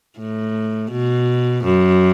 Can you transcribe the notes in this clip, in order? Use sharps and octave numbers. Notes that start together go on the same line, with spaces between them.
A2
B2
F#2